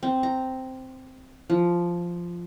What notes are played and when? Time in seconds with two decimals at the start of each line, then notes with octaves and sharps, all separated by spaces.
0.03 C4
0.23 A#5
1.50 F3